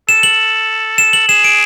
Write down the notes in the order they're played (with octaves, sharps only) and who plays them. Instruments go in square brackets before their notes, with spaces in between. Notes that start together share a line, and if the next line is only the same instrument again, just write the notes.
[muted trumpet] A4 [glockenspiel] E7
[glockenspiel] F#7
E7
F#7
[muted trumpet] G#4 [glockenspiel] E7
[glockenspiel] D7